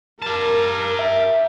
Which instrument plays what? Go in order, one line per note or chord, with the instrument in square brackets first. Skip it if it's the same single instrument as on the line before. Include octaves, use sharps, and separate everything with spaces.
[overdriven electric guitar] G4 A5 [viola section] A#4
[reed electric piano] E5